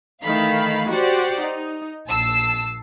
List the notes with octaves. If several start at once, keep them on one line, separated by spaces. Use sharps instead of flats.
D#3 E3 A3 F5 B5
F#4 G4 C5 D5 F#5
D#4
A#1 A5 E6 C7